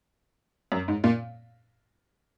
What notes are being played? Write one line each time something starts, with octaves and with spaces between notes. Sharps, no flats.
F#2
G#2
A#2